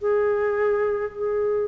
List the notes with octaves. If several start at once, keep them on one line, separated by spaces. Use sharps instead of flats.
G#4
G#4